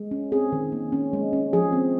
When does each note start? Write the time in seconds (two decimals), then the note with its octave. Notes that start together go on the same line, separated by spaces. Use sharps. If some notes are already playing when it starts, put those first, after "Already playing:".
Already playing: G#3
0.11 C#4
0.32 C4 G#4
0.52 D#3
0.72 A#3
0.92 C#4
1.13 G#3
1.33 C#4
1.53 F3 G#4
1.73 C4